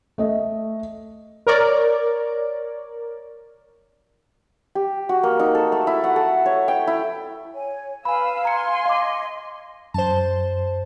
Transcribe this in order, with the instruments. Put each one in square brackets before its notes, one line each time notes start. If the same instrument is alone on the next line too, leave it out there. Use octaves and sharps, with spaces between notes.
[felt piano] A3 D#5
[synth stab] A#4 C#5 D5
[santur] G4
F#4
A#3
D#4
A4
A3
E4
F#5
A4
C#5
G5
E4
[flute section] C#5 G#5
[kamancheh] B4 E6 [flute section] F5 [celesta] G#5 B5
[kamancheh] G#5 C6 [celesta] A#5 C#7
[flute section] D#5 [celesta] F5 D6
[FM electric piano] F#2 [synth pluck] C5 A5